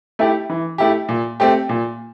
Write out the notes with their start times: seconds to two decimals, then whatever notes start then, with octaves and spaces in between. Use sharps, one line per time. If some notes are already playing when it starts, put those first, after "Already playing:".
0.19 A3 E4 G4
0.49 E3
0.78 A3 E4 G4
1.09 A#2
1.40 A3 C4 G4
1.69 A#2